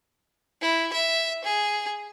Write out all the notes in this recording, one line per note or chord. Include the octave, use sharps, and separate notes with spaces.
E4
E5
G#4